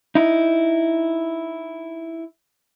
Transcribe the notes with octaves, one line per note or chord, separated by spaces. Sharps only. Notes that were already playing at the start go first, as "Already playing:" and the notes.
D#4 E4